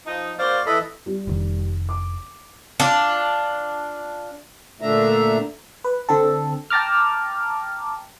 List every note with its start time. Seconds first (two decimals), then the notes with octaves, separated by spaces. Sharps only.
0.06 F3 D#4
0.39 A#3 F#4 C5 D5 F5
0.66 E3 A4 D#5 B5
1.06 G3
1.27 F1 D#3
1.89 D6
2.80 D4 F4
4.81 A#2 D3 A3 D4 E5 A#5
5.84 B4
6.09 D3 C4 A4
6.70 G5 A5 A#5 D6 F6